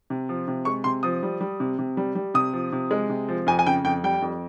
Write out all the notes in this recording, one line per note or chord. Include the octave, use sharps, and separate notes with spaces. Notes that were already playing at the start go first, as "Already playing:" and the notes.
C3
F3
C3
G#3 C#6
C3 C6
F3 D#6
G3
G3
C3
C3
G3
G3
C3 D#6
F3
C3
G#3
C3
F3
F2 G#5
G#5
C#3 G5
F2 G5
G3 G5
F2